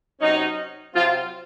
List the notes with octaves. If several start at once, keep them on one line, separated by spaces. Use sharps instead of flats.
C3 F#3 C#4 D#4
C3 F#3 C4 F4